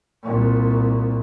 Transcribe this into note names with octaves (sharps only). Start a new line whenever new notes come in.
C2 A#2